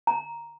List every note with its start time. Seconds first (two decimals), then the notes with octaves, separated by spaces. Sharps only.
0.07 A#5